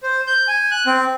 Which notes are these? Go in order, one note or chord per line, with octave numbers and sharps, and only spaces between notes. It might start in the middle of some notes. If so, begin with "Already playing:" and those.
C5
G6
G#5
F#6
C4